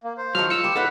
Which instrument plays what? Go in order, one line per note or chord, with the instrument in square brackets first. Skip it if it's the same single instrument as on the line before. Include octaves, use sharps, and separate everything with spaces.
[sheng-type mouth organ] A#3
C5
[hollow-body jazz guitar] D#3 F3 F#3 [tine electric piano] F6
[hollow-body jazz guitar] F4 [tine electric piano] E6 C#7
[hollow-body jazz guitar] G3 A#3 [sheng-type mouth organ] G4
[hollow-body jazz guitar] A2 D#4 A4 [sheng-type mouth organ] B4 F#5